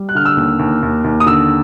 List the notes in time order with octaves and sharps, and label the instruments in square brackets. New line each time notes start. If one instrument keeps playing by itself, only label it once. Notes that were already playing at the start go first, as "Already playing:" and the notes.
Already playing: [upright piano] G3
F#6
D3 F6
E6
D#2
D#2
D#2
D#2
D#6
D3 E6